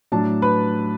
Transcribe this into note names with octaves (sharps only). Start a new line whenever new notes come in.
A2 F#3 D4 A5
B4 B5